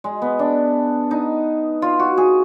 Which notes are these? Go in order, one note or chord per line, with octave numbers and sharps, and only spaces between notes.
G#3
B3
D4
D#4
F4
F#4
G#4